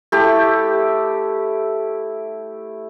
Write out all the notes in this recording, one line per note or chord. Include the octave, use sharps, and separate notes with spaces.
A3 E4 G4